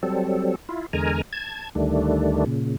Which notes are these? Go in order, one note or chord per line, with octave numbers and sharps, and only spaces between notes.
F#3 G3 C4 A4
E4 F4
E2 D3 G#3 A#4 G#5 A#5
A5 G#6
D2 D#3 G3 A3 D4
A#2 C#3